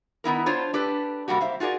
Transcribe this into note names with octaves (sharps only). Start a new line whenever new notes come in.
D#3 B3 E4 A#4
D4 F4 C5 C#5
D4 G4 A4 B4
C3 G3 A#3 F#4 G4
C5 E5 F5
F4 F#4 G#4 A#4 D5